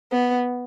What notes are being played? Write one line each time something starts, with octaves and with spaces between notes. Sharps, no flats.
B3